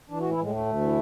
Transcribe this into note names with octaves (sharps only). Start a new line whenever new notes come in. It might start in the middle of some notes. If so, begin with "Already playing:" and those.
E3 D4
A2 F#4
E4
A2 G#3
D2 A3
D2
E3